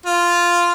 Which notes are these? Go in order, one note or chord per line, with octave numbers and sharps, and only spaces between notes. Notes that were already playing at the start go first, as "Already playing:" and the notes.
F4